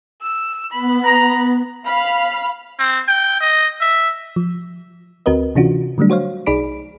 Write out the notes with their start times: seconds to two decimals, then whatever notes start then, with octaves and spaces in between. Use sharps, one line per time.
0.22 E6
0.72 B3 B5
1.05 A#5
1.86 F5 B5 F6
2.79 C4
3.08 G5
3.40 D#5
3.81 E5
4.36 F3
5.26 D2 C4 F#4 A#4 B4 D#5
5.55 C3 E3 C#4 D4 F4 F#4
5.98 D3 F#3 G3 A3 D4
6.10 F#4 C5 C#5 F5
6.46 B1 D#4 G#4 D5 B5 D7